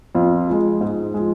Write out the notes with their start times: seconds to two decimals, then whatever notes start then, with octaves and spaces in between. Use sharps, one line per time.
0.15 F2 F4
0.48 F3 G#3
0.81 G#2
1.14 F3 G#3